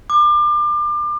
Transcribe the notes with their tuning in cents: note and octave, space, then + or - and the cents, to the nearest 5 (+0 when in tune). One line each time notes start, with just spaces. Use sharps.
D6 +30